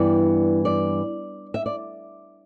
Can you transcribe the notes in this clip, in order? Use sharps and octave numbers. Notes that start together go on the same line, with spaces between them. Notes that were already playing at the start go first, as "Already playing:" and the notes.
Already playing: G2 E3 G3 B3 D5
D5
E5
D5